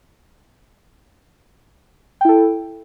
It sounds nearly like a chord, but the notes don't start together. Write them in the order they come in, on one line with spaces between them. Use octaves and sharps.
G5 E4 A4